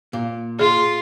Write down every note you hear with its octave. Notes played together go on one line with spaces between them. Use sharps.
A#2
F4 G#4